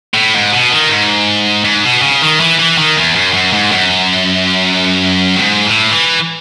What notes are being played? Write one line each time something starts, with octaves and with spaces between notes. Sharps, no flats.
A2
G#2
B2
D#3
G#2
G#2
B2
C#3
D#3
E3
E3
D#3
E2
F#2
F#2
G#2
F#2
A2
G#2
A2
E3